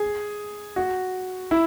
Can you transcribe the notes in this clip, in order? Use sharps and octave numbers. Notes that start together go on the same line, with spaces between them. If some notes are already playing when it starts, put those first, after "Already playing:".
Already playing: G#4
F#4
E4